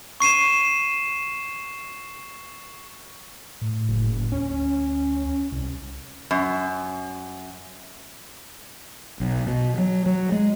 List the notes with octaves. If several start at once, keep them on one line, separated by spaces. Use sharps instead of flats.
C#6 C7 D#7 E7
A2
F#1
D2 C#4
C2
F#2
B1
B2
F#3
F#3
G#3